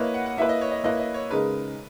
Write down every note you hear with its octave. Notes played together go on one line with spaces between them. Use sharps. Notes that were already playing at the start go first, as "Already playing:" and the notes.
Already playing: A#3 E4 B4 C#5 D#5
F#5
F#5
A#3 E4 B4 E5
D#5
C#5
D#5
A#3 E4 B4 D#5
D#5
C#5
C#3 G#3 D#4 A#4 B4